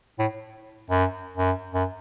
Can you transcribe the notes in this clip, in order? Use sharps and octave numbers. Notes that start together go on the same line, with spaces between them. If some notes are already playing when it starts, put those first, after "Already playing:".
A2
F#2
F#2
F#2